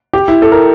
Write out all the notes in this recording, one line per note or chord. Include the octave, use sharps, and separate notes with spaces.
G4
E4
A4
A#4